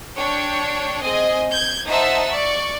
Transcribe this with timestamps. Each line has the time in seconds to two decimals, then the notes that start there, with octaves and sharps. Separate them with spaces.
0.16 D4 C#5 G5
1.01 C4 G#4 D#5 G#5
1.51 G6 G#6
1.88 D#4 C5 E5 F#5 A5 A#5
2.30 D5 C#6